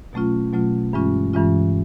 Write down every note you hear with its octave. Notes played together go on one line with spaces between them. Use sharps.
B2 F#3 A3 C#4 F4
B2 F#3 A3 C#4 F4
G2 E3 G#3 C#4 F4
G2 E3 G#3 C#4 F4